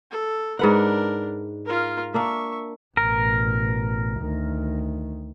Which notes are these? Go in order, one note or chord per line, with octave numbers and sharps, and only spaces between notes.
A4
G#2 D4 A#4 B4 F#5
F4 A#4
A#3 D4 E5 F5 C#6
A1 B2 A#4
D2 D#3